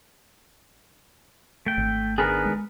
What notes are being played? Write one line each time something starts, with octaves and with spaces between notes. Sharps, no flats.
A3 G5
G#1
D#3 B3 D4 G#4 A#4 B4
G#3